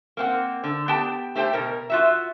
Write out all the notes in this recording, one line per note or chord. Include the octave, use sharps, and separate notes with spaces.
A#3 C4 F#5
D3
B3 G4 G5 A5
A3 G4 C5 G5
B2 A#4
F4 F#4 E5